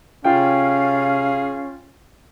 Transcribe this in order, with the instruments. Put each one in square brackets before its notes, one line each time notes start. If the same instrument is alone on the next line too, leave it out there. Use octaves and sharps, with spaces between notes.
[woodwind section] C3 G#4 F5 [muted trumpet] C#4 [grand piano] F4 G5